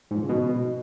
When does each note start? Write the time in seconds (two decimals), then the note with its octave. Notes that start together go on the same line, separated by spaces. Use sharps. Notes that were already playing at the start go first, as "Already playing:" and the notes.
0.11 G#2
0.17 F3
0.23 C#3
0.29 B2